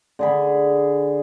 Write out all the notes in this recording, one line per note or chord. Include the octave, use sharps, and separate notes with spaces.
D3 G#4 B5